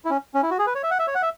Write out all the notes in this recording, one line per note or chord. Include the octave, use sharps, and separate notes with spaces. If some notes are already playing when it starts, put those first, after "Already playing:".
E4
C#4
C#4
E4
F#4
G#4
B4
C#5
E5
F#5
E5
C#5
F#5
E5